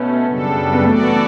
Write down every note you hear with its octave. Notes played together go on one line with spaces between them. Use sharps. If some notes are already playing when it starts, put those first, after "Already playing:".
Already playing: B2 A3 B3 C#4
F#2 C#3 G3 D4 A4
B3
E3 A3 B3 F#4 A4 D5